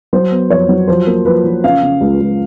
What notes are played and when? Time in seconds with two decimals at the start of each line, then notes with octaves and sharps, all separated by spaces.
0.13 F#3 C5
0.31 B3
0.50 F2 C#5
0.69 F#3
0.87 F3 C5
1.07 A#3
1.25 F3 B4
1.44 F3
1.64 C#3 F5
1.83 C#3
2.01 C#2
2.21 C#2